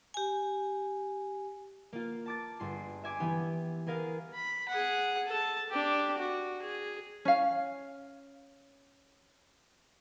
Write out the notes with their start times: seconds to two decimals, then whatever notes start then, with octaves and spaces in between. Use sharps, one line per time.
0.14 G4 G#5
1.93 A#3 F4
2.26 A5 D6 A6
2.60 G1 G#4 C6
3.04 E5 G#5 D6
3.20 E3 B3 G4
3.87 B3 G#4 A#4 F5
4.34 B5
4.68 G#4 F#5
5.27 A4 A5
5.69 D4 G4
6.18 F#4
6.62 G#4
7.25 C#4 F5